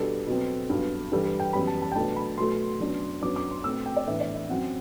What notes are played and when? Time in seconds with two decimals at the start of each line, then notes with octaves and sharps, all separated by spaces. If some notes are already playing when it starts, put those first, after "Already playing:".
Already playing: B2 G3 D4 A4
0.27 B2 F#3 C4
0.70 G2 F#3 B3
1.12 G2 E3 G3 A4
1.26 A4
1.40 G5
1.53 F#2 E3 G3 B3 B5
1.67 A5
1.82 A5
1.92 G5
1.95 B2 F#3 A3 D4 A5
2.16 B5
2.38 B2 F#3 A3 C6
2.80 F#2 F#3 B3 D4
3.22 F#2 F#3 B3 D4 D6
3.36 D6
3.51 C6
3.64 B2 A3 C4 E6
3.86 G5
3.96 D5
4.07 A2 E3 B3 D4 E5
4.20 D5
4.35 E5
4.49 F#2 F#3 C4 F#5